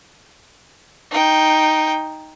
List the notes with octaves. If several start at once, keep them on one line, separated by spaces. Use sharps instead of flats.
D#4 G5